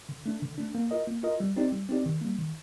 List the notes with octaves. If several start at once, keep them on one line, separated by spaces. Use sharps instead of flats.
D3
A3 D4
D3
A3 D4
A#3
F4 A#4 D#5
A#3
F4 A#4 D#5
G3
C4 D#4 G4 D5
G3
C4 D#4 G4 D5
D#3
G3 A#3
D#3